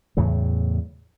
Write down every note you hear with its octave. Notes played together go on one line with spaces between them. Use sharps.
E2 A2 C#3 F#3